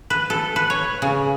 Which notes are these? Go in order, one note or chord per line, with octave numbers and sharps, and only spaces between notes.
B4
A4
B4
C#5
C#3